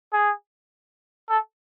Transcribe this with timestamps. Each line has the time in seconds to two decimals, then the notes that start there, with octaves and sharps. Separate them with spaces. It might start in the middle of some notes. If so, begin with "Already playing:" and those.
0.13 G#4
1.29 A4